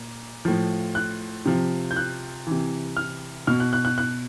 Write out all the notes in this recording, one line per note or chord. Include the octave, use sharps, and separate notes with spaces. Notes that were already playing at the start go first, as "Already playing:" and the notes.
Already playing: A#2
A2 F3
F#6
C3 F3
G6
F#6
C3 E3
F6
B2 F6
F#6
F#6
F#6
F#6